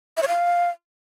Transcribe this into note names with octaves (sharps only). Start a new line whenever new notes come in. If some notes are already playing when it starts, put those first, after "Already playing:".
E5
C#5
F5